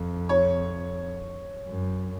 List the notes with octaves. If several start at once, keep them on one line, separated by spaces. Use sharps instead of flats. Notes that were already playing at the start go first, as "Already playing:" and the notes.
Already playing: F2
C#5
F#2